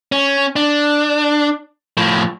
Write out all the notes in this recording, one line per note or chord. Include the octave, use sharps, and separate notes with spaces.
C#4
D4
A2 F3